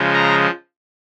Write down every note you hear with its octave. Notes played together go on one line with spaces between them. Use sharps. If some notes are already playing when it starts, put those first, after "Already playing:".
Already playing: C#3 F3 G#3
A#5